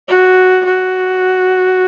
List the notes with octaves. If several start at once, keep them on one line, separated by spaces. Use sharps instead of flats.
F#4
F#4